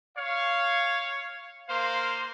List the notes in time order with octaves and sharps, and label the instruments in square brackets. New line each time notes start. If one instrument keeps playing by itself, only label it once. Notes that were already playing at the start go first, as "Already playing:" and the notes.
[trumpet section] C#5 F5
A#3 C5 F5 C6